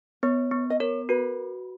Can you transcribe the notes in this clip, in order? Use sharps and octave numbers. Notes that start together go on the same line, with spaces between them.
B3 C#5
B3
D#5
A#4 C#5
F#4 B4